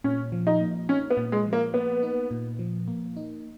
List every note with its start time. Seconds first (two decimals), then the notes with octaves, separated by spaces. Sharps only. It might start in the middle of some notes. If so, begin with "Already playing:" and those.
0.04 A#2 C#4
0.32 F3
0.47 D#4
0.61 A#3
0.89 C#4 D#4
1.10 B3
1.17 A#2
1.32 G#3
1.46 F3
1.53 A#3
1.74 A#3 B3
2.03 D#4
2.31 A#2
2.59 F3
2.88 A#3
3.17 D#4